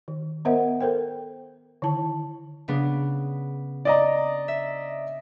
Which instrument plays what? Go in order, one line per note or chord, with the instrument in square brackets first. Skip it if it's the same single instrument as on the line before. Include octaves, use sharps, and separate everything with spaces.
[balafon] D#3
B3 A#4 C5 D#5 E5 F#5
A4 A#4 C5 G5
D3 D#3 E4 A5
[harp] C#3 B3 D4
[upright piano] D5 D#5 A#5
[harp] E5